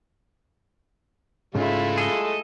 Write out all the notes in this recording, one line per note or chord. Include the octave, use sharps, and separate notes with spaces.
G#2 C#3 G#3 A3 E4 F4
G#4 A4 D#5